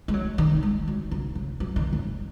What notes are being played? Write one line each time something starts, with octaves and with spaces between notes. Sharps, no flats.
G#3
F#3
D#3
G#3
F#3
C#3
C#3
F#3
D#3
F#2